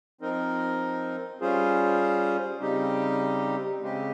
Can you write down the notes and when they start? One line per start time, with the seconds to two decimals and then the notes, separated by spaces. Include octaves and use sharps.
0.21 F3 C4 D#4 A#4
1.41 G3 C#4 F4 G#4 C5
2.60 C#3 G3 C4 D#4 G4
3.81 C#3 G#3 C4 G4